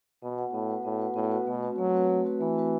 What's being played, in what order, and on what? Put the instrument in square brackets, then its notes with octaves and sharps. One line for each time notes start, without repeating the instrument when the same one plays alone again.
[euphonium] B2 [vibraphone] B3
[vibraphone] F#4 B4 F#5
[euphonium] A2 [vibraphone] B3
[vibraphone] F#4 B4 F#5
[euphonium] A2 [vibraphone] B3
[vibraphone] F#4 B4 F#5
[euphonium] A2 [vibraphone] B3
[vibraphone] F#4 B4 F#5
[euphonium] B2 [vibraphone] A3
[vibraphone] C4 F#4 B4
[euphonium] F#3 [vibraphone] A3
[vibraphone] C4 F#4 B4
A3
C4 F#4 B4
[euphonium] E3 [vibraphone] A3
[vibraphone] C4 F#4 B4